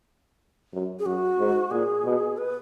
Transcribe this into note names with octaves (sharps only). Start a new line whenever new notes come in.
F#2
G#4
F#2 F#4
G#2
A#2 G#4
B2
B4